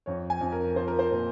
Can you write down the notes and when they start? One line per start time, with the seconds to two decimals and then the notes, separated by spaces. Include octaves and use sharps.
0.06 F2 C#5
0.30 G#5
0.41 F2
0.52 A#4
0.76 F3 C5
0.88 A#4
0.99 C5
1.11 A#2